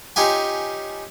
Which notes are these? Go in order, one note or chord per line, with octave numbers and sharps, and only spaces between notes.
C#4 D#4 F4 G4 G#5